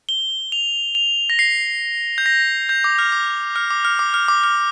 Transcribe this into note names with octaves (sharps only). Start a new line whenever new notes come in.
G7
F7
F7
A#6
C7
G6
A#6
G6
D6
F6
D6
F6
D6
F6
D6
F6
D6
F6